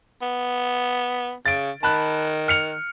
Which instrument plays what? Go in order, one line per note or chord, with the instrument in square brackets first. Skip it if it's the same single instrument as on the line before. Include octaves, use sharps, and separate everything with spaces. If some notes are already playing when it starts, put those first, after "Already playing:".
[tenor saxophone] B3
[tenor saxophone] C#3 [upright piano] A6 D7
[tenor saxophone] D#3 [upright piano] A5 B5 F#6
[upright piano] F6 C#7 F7